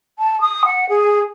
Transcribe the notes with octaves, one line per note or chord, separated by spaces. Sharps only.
A5
D#6
F#5
G#4